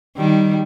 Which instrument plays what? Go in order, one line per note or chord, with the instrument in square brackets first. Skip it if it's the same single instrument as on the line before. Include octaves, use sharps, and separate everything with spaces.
[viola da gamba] D#3 G3